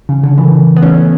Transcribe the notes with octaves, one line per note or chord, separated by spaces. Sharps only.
C#3
D3
C#3 E3
B3
A3 C#4